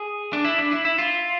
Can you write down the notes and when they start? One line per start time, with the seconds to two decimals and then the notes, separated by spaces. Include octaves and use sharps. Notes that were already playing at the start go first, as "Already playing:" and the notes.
Already playing: G#4
0.33 D4
0.44 E4
0.58 D4
0.71 E4
0.85 E4
0.98 F4